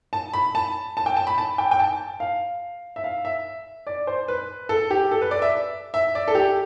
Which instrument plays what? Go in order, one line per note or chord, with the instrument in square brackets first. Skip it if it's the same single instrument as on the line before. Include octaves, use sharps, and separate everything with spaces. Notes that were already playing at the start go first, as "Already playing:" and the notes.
[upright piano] A5
B5
A5
A5
G5
A5
B5
A5
G5
G5
A5
F5
E5
F5
E5
D5
C5
B4
A4
G4
A4
B4
D5
E5
E5
D5
A4
G4